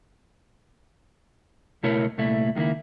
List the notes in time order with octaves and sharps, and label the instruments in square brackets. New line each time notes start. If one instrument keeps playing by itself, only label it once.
[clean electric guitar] C#2 B2 A3 E4 A#4 C#5
C2 A#2 A3 E4
C#2 D#3 G#3 A#3 E4